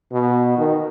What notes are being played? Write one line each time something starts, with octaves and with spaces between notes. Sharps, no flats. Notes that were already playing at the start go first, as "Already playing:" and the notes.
B2
D#3